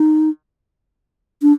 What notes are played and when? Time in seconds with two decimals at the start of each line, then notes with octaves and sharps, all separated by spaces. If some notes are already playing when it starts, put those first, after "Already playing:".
Already playing: D#4
1.42 D4